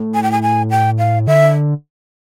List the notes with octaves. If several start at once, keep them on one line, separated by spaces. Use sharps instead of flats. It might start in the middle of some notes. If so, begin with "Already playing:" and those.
Already playing: A2
G#5
G5
G#5
G#5
G5
F5
D3 E5